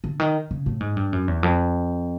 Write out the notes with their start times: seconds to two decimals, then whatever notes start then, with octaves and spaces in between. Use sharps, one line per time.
0.04 D3
0.20 D#3
0.51 C#3
0.66 A2
0.80 G#2
0.97 G2
1.13 F#2
1.28 E2
1.43 F2